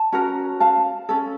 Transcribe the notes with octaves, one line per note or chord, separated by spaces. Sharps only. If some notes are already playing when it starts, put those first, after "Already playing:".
Already playing: A5
C#4 F#4 A#4
F5 A5
C#4 A4